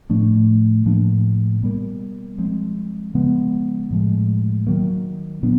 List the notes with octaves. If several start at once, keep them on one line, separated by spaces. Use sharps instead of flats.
A2 F3 A3 D4
A2 F3 A#3 D4
B2 G3 A#3
F3 G#3 C4
C#3 F3 G#3 B3
A2 F3 G#3
D#3 F#3 A#3
A#2 F#3 B3 D4